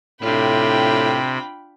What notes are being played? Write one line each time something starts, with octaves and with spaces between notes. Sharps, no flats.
A2 C3 D4 F4 G5 B5